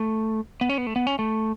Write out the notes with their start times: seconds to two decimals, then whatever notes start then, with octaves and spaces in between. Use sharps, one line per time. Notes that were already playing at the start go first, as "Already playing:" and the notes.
Already playing: A3
0.61 B3
0.69 C#4
0.78 B3
0.87 A3
0.96 B3
1.07 C#4
1.19 A3